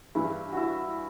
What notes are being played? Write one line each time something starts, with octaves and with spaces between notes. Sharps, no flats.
G2 E3 G3 E4
E4 F#4